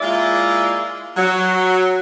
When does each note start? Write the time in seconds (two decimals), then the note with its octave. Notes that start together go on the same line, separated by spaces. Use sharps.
0.01 G#3 A#3 E4 F4 D5 E5
1.17 F#3